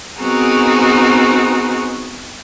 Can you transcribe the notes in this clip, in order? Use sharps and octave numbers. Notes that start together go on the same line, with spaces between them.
B3 C4 D#4 F#4 G#4 A#4